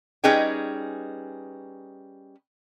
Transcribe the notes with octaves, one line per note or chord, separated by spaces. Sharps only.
G3 C#4 D#4 G#4 B4 G5